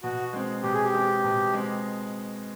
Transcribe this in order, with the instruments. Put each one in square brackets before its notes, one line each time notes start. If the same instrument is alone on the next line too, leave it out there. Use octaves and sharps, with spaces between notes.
[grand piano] B2 [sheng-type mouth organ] F#4
[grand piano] G#3 C4
[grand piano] B2 [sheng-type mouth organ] G4
[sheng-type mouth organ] G#4
G4
[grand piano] G#3 C4
B2
G#3 C4